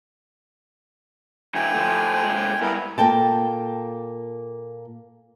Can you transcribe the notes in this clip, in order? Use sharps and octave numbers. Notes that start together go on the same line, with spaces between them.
D3 F#3 G5 G#5
F3 A3
C3 G#3
G2 B3 E4 A#4
A#2 A#3 A4 G5 A5